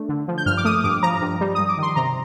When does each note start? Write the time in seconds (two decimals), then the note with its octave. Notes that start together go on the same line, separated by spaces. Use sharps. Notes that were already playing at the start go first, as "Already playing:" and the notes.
Already playing: A3 D4
0.09 D3
0.28 F3
0.38 G6
0.46 G2 F6
0.57 D6
0.65 A3 D#6
0.84 G2 D6
1.03 F3 A#5
1.21 G2
1.41 G3
1.55 G2 D#6
1.69 D6
1.78 D#3 C6
1.96 C3 A#5